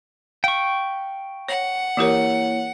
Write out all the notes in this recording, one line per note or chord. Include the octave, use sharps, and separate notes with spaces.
F5 G5 C#6
C#5 F#5
E3 A#3 E4 G4 A#4 C#5